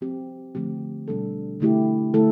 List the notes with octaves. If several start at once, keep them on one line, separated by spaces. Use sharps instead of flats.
F3 C4 G4
D3 F3 A3 C4 G4
B2 G3 D4 A4
D3 A3 E4 G4
D3 A3 E4 A4